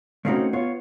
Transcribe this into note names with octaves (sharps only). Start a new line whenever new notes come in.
A3 A#3 C4 C#4 D#4 F#4
B3 F4 C#5